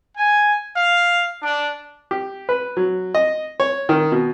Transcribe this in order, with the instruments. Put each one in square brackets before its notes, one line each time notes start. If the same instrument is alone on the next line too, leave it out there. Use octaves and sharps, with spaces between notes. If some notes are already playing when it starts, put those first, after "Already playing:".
[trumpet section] G#5
F5
D4
[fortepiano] G4
B4
F#3
D#5
C#5
D#3
B2